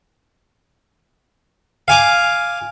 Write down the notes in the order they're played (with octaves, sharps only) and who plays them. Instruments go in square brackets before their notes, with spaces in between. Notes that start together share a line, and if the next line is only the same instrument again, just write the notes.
[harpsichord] F5 G#5 D6